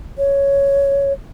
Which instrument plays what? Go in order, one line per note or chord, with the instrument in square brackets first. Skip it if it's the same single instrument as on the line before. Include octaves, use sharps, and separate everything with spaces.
[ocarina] C#5